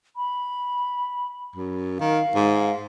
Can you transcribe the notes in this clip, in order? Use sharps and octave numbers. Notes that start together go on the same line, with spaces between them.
B5
F#2
D#3 F5
G#2